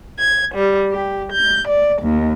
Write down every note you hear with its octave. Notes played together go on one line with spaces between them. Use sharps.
G#6
G3
G4
G6
D5
D#2